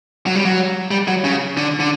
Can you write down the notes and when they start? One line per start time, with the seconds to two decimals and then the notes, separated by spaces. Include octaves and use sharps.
0.27 F#3
0.36 G3
0.45 F#3
0.91 G3
1.08 F#3
1.24 C#3
1.57 D3
1.80 D3